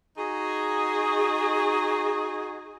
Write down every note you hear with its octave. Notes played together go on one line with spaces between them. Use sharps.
D#4 F#4 G#4